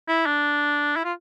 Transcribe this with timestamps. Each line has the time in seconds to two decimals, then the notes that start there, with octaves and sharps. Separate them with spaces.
0.08 E4
0.26 D4
0.96 E4
1.04 F4